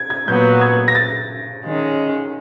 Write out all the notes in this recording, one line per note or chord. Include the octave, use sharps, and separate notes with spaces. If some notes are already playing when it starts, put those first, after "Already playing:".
Already playing: G#6
G#6
A#2 F#3 B3 G6
G#6
A#6
A6
D#3 G#3 C#4